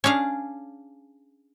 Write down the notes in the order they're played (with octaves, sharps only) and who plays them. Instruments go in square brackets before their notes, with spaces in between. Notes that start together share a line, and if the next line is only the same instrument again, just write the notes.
[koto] C#4 D4 G#4 F5